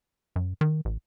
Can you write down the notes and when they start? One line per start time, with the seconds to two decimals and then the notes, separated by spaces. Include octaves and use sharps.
0.36 F#2
0.61 D#3
0.85 A1